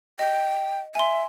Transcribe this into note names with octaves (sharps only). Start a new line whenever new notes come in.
D#5 G5
E5 G#5 C6